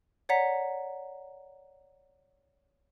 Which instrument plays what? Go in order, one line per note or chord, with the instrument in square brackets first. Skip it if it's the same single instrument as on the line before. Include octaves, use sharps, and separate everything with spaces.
[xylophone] C#5 D5 F#5 A#5 B6